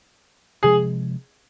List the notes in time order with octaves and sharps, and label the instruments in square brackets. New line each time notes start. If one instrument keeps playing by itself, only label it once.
[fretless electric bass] C3 F3 G#3 [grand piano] G#4